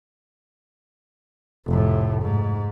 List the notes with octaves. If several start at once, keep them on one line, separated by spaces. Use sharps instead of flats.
F1 A2
G#2